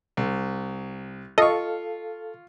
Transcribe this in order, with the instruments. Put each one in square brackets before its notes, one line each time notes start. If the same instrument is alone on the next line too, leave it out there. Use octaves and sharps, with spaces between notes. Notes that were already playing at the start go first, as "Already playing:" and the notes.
[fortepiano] C2
[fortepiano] F4 C#6 [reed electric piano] A4 F5 [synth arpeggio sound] D#5